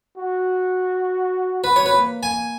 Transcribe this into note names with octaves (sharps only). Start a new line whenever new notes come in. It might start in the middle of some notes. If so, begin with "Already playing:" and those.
F#4
F#4 B4
C#5
B4
A#3
A#3 G#5